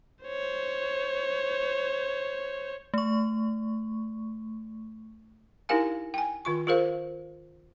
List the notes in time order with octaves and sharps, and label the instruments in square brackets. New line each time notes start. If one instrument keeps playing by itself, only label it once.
[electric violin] C5 C#5
[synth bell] A3 C#6
[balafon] D#4 E4 G4 A#4 F5 G#5
G5 G#5
D#3 F4 C#6
F4 G#4 A#4 C5 F5